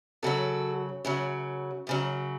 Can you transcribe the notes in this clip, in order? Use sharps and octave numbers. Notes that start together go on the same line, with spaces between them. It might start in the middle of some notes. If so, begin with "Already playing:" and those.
F#2 C#3 F#3 F#4 A4
F#2 C#3 F#3
F#2 C#3 F#3